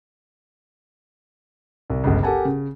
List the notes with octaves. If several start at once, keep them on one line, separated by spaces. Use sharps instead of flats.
C2
G1 C#2
G4 A4 A#4 F#5 G#5 A5
C#3